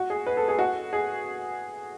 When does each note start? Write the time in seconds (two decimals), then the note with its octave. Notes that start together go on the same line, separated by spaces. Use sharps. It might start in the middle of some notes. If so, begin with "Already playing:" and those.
Already playing: F#4
0.10 G#4
0.26 B4
0.37 A4
0.48 G#4
0.59 F#4
0.93 G#4